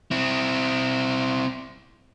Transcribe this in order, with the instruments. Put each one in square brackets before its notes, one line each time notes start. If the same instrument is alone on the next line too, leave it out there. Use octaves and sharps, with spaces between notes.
[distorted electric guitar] C4 E4